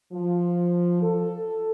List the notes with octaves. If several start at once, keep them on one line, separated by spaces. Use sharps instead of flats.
F3
A4